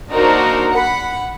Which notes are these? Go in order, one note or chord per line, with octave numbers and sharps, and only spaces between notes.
A#3 D4 D#4 F#4 A#4 C5
F#5 B5